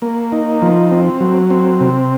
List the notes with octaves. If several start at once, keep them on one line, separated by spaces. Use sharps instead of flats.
A#3
D#4
F3
C4
F#3
C4
C3